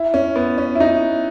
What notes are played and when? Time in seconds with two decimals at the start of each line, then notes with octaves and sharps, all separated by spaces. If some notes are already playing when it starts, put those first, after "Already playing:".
Already playing: E4
0.14 C#4
0.36 B3
0.58 C#4
0.75 E4
0.80 D#4